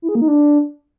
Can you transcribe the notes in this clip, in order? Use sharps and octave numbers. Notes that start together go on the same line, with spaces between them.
E4
G#4
A#3
D#4
D4